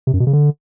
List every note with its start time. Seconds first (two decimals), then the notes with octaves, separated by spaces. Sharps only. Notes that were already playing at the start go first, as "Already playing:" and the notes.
0.07 C3
0.14 F#2
0.20 B2
0.27 C#3
0.33 D3